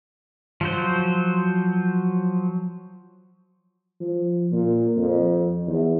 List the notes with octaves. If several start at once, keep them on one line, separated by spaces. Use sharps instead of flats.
F3 F#3 C5
F3
A#2
F2
E2